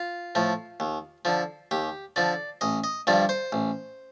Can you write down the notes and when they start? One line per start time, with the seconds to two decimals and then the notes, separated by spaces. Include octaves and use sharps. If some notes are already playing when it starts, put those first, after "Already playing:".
Already playing: F4
0.35 A2 F3
0.80 D#2
1.25 D3 F3
1.71 D#2 G4
2.16 D3 F3 D5
2.61 A1 D#5
2.84 D#5
3.07 G2 D3 F3 D5
3.29 C5
3.52 A1